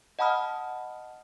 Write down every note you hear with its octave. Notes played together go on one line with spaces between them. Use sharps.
D#5 F#5 A5 B5 D#6 F6